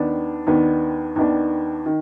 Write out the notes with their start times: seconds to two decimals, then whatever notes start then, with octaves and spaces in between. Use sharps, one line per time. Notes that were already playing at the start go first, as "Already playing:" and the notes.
Already playing: D#2 D#3 B3 D4
0.47 D#2 D#3 B3 D4
1.16 D#2 D#3 B3 D4
1.86 D#3